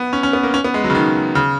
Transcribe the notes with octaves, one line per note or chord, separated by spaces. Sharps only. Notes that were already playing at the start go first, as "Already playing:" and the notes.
Already playing: B3
C#4
C#4
B3
A#3
C#4
B3
G#3
F#3
C#3
D#3
C#3